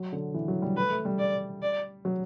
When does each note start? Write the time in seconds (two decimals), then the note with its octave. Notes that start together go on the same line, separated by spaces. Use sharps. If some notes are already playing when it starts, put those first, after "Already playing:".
Already playing: F#3
0.12 D3
0.34 E3
0.48 F#3
0.62 G3
0.76 A3 B4
0.91 A3
1.05 G3
1.19 D5
1.62 D5
2.05 F#3